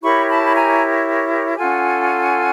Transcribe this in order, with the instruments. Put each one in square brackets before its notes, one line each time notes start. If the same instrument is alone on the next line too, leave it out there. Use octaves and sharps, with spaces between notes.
[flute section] E4 G4 A#4 C#5 B5 C#6
A5 B5
B5
G#5 A#5
C#4 F4 A4 F#5 G#5